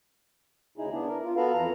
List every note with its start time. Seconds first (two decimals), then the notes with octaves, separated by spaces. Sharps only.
0.78 D2 C#3 D#4 E4 G#4
0.91 B3 D4 E4
1.08 A#4
1.24 F4
1.36 B3 F#4 A4 B4 F5
1.54 F2 E3 A#5